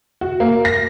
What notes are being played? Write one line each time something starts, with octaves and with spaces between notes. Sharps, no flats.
F#4
A#3
A#6